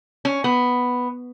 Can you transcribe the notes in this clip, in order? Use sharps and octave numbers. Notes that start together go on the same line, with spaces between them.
C#4
B3